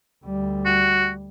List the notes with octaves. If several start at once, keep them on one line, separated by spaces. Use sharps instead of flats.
D2 G3
F#4